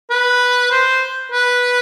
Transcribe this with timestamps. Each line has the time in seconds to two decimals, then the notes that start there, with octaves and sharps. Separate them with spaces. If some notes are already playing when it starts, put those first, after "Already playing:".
0.10 B4
0.71 C5
1.32 B4